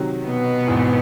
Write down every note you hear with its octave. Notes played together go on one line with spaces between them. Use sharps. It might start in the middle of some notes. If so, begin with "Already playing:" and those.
Already playing: C3 D#3 F#3
B2 B3
G#1 G#2 E3